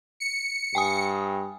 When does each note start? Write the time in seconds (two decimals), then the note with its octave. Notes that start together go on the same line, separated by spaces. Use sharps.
0.20 C#7
0.75 G2 G5 G#5 D#6